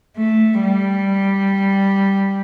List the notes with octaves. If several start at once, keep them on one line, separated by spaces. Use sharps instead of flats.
A3
G3